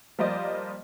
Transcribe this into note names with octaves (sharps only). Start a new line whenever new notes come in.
F3 G3 A#3 C5 D5 D#5